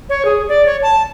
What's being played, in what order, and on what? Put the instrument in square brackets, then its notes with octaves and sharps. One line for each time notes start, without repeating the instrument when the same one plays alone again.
[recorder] C#5
G#4
D5
C#5
A5